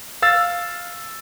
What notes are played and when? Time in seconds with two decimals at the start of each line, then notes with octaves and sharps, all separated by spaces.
0.22 F5 E6 A6